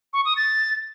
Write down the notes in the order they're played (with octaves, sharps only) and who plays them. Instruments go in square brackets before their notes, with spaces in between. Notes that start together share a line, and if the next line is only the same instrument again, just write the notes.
[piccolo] C#6
D#6
A6